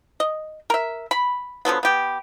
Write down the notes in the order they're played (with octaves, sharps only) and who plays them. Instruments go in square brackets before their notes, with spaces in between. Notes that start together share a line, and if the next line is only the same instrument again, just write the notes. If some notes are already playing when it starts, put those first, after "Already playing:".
[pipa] D#5
A#4 E5
B5
D3 F3 F#3 B3
B3 G4